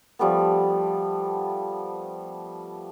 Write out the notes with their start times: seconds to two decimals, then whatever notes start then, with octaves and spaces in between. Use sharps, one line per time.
0.19 F3 G3 A3 B3